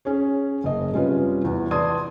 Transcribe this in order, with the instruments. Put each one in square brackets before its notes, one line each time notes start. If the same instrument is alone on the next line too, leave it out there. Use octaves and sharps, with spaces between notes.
[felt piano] C#4 G#4 C#5
F#1 D#5
C3 G3 C#4 F4 B4
E2
B4 D5 A5 C6 D#6 G#6